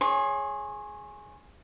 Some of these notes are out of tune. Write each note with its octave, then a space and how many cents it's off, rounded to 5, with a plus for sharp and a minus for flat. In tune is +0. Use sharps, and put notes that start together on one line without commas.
G#4 +0 C#5 +0 C6 +30